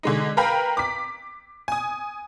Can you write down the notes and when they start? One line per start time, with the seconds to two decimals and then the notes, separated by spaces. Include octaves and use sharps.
0.03 D3 G#3 D#4
0.37 A#4 B4 F5 G5 A#5 B5
0.77 D6 B6
1.68 G#5 D#6